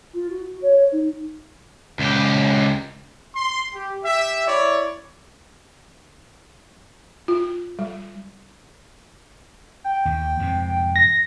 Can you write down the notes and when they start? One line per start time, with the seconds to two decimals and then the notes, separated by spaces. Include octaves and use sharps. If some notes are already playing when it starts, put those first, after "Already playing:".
0.14 F4
0.30 F#4
0.62 C#5
0.92 D#4
1.99 C#2 G4
3.36 C6
3.75 G4
4.05 G4 E5
4.47 E4 C#5 D5
7.28 F4
7.79 G3
9.84 G5
10.05 D#2
10.40 F2 G#2 C3
10.96 A#6